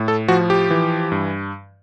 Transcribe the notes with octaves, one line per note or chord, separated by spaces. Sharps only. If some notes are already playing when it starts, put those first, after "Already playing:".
Already playing: A2
A4
F3 F#4
G4
E3
G2